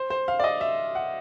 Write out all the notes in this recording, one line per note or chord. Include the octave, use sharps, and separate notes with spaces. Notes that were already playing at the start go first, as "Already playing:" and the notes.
Already playing: C5
C5
F5
D5
D#5
E5
F#5